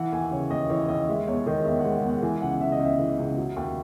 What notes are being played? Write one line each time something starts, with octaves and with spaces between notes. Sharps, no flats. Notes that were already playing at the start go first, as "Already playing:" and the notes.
Already playing: E3 F#5
D#2 G#5
C#3 C#5
D#2 D#5
E3 C#5
D#2 D#5
G#3 E5
E2 C#5
D#3 D#5
E2 E5
F#5
G#3
F#5
E2 F#5
E3 G#5
C#2 F#5
C#3 E5
D#5
C#2 E5
E3
C#2
F#3
D#2